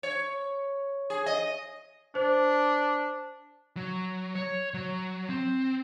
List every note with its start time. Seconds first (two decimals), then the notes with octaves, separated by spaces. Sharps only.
0.03 C#5
1.10 G#4
1.26 D#5
2.15 D4 C5
3.77 F#3
4.35 C#5
4.74 F#3
5.29 C4